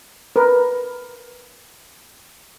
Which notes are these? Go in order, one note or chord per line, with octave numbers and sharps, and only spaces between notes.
A#4 B4